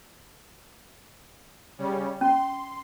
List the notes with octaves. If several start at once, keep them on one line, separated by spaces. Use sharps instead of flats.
C#3 G3 C#4
C#4 C6